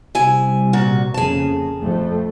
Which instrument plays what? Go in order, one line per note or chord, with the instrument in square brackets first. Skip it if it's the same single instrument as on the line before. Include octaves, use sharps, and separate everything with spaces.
[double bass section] C3 G3 [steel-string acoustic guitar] E4 G#5
[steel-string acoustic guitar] A#2 F#4
[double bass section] F2 C#3 A#3 [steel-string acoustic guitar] G#4 A5
[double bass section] F2 A3